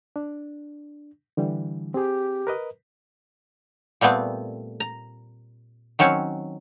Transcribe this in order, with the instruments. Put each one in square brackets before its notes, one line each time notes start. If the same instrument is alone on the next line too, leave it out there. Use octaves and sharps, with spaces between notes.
[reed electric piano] D4
D3 E3 G3
[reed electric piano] C4 G#4 [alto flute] G4
[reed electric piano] A#4 B4 D#5
[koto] A#2 G3 A3 B3 C4
A#5
D#3 F#3 C4 C#4 C#5